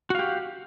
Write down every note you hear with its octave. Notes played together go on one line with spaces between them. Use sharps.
F#4 G4 F5